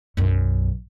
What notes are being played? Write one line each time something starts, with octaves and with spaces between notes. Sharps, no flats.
B1 F#2